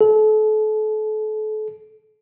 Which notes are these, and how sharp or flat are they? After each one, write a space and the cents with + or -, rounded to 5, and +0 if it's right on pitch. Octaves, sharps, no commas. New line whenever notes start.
A4 -35